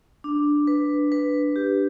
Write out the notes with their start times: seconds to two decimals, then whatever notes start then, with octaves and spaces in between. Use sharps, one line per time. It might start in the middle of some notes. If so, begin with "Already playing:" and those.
0.24 D4
0.67 B4
1.12 B4
1.56 G4